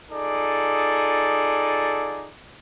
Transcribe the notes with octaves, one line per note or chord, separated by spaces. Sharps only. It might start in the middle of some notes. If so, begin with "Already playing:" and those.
D#4 F4 G#4 A4 D5